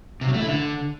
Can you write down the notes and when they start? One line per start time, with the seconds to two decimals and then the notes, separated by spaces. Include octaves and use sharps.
0.21 C3
0.28 F#3
0.34 A3
0.40 E4
0.47 D3